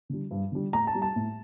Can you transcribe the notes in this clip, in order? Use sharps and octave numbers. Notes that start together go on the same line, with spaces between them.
D3 G3
G2
D3 G3
A2 A#5
A5
G3
A5
A2